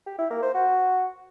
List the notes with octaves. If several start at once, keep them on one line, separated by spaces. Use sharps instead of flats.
G4
E4
A#3
C5
F#4